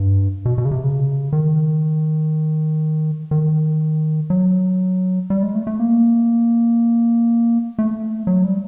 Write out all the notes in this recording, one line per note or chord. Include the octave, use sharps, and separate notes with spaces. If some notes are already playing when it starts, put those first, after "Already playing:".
Already playing: G2
B2
B2
C#3
C3
C#3
D#3
D#3
F#3
G3
G#3
A3
A3
A#3
A3
F#3
G3